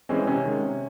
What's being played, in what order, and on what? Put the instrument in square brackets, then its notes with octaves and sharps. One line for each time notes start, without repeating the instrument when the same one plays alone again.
[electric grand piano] E3 G#3 C4 [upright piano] C#4
[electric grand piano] C3 [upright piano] C#4
[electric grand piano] D#3 G#3
C3